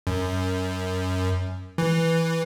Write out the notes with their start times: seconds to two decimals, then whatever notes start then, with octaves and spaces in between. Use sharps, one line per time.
0.07 F#2
1.78 E3